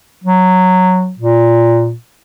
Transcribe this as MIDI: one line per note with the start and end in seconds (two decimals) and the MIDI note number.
0.24 1.12 54
1.19 1.93 46